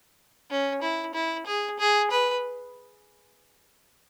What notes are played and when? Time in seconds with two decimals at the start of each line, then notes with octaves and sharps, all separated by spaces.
0.50 C#4
0.82 E4
1.14 E4
1.46 G#4
1.79 G#4
2.11 B4